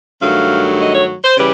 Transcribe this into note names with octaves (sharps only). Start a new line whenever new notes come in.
G2 D#3 F#3 A3 F5
D#5
C#5
C5
C#3 E3 G3 B4